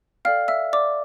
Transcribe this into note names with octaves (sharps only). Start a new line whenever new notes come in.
A4 D5 F5 G5 F6
E5 E6
D5 D6